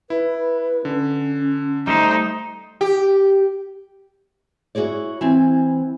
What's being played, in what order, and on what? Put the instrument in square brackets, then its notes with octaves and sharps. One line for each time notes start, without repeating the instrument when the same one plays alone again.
[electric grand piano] E4 [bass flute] B4
[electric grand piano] D3 [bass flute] C#4
[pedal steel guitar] G3 A3 C5 [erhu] D#4
[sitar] G4
[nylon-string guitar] E4 F#4 G#4 C#5 D5
E3 C4 G#5